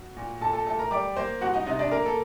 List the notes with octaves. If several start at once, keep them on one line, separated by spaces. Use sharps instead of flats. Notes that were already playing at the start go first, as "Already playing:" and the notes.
Already playing: F#4
A#2
A#2 A4 A5
A4 A5
A3 A4 A5
A#4 A#5
G3 D5 D6
A#3 C5 C6
C2 F#4 F#5
D#4 D#5
C3 D#4 D#5
D4 D5
A#3 A#4
A4